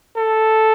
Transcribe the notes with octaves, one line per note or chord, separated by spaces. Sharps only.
A4